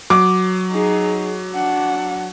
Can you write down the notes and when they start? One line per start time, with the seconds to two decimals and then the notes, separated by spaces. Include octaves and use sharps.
0.10 F#3 D6
0.71 D#4 G#4
1.52 D4 F#5